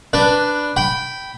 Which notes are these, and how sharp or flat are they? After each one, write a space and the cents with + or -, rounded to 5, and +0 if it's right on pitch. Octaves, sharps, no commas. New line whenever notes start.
D4 +0 B4 +0
G5 -15 B5 +0